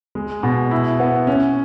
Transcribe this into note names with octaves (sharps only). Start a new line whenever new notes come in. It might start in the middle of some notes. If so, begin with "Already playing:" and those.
G#3
B2
E4
B3
C#4